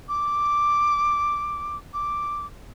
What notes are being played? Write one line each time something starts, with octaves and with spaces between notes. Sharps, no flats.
D6
D6